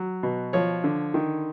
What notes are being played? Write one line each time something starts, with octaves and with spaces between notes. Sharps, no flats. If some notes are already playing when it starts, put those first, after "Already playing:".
Already playing: F#3
B2
F3 C#5
D3
D#3